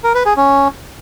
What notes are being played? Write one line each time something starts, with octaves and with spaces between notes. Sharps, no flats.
A#4
B4
G#4
C#4